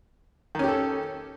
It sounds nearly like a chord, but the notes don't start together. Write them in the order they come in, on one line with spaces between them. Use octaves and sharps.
D#3 C#4 G4 A4